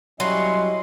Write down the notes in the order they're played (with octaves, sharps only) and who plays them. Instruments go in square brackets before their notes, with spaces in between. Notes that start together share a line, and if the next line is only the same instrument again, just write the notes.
[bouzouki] F#3 [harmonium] G3 C#4 E4 [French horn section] D#5 [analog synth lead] C6